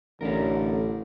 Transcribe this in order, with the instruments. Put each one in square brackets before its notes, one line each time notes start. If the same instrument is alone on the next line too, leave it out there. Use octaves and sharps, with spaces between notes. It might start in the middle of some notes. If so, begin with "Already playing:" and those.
[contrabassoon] A1 [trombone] D3 [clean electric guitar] C#4 A4 A#4